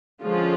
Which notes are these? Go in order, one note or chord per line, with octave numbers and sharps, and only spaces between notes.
D3 F3 G#3 C#4 F4